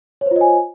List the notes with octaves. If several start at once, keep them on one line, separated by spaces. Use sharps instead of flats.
F4 C5 C#5 D#5 G#5